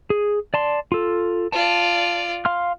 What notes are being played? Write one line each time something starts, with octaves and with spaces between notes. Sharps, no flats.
G#4
D5 A5 C6
F4 A4
F4 D5 A5
F5 C6 F6